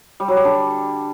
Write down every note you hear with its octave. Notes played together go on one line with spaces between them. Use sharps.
G3
F#3
G3
D3